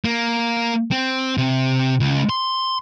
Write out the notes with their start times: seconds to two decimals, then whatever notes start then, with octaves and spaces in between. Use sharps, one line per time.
0.05 A#3
0.91 C4
1.38 C3
2.00 C#2
2.29 C6